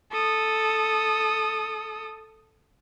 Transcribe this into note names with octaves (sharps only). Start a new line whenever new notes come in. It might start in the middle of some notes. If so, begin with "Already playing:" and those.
A4 D#6